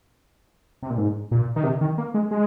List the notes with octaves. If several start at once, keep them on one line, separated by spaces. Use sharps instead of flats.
C3
A#2
G#2
A#2
D#3
C3
D#3
A#3
G#3
G#3